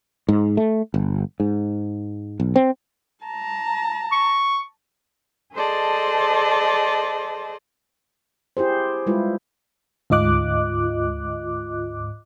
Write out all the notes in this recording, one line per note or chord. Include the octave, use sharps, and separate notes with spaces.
G#2
A3
G1
G#2
B1
C4
A5 A#5
C#6
G#4 A4 C5 D5 D#5 A5
E4 G4 G#4 C5
G3 G#3 E4 F4 B4
D2 G#2 F4 D#5 D6 F#6